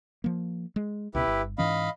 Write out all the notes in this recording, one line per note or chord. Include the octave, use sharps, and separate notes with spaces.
F3 A#3
G#3
C#2 B2 E4 G4 B4
G1
G#2 E3 C#4 D#5 F5 B5